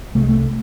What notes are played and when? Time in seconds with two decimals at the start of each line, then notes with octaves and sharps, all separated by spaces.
0.15 C2 C3 A3
0.22 G#3
0.29 A3